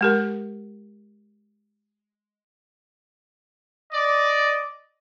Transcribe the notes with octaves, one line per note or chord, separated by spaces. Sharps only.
G#3 G4 A#4
D5 D#5